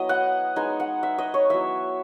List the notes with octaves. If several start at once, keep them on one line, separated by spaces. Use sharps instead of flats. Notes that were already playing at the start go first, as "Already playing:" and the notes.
Already playing: F#3 B3 E4 D#5
F#5
G#3 B3 D#4 G#5
F#5
E5
D#5
C#5
F#3 B3 E4 E5